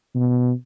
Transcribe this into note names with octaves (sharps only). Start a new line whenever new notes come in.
B2